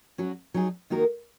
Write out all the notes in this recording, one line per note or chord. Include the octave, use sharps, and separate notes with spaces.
F#3 C#4 F#4
F#3 D#4 G#4
D#3 A#3 D#4 F#4 A#4